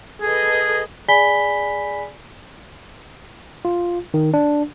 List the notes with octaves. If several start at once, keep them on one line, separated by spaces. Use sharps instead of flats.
G#4 A4 B4 D#5
G#4 D5 G#5 B5 B6 G7
F4
D#3
D4